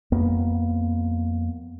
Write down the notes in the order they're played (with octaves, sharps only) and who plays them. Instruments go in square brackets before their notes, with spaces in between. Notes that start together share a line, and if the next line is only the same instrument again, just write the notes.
[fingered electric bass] F2 A#3 B3